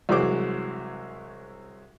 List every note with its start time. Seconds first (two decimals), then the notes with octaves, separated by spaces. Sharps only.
0.09 C2 E3 F#3 G#3 C5 D6